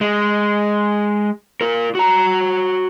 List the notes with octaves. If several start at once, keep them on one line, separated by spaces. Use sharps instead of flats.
G#3
F4 A#4
F#4 A#5